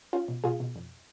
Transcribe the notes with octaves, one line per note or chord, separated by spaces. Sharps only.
C#4 F4
B2
B2 F4 G#4
B2
F2